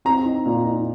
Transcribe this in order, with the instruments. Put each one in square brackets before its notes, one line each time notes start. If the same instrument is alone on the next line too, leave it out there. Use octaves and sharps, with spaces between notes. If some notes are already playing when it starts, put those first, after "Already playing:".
[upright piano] C4 A#5
D#4
A#2
D#4